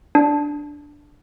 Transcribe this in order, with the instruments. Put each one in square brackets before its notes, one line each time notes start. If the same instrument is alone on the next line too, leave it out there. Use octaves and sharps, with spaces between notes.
[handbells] D4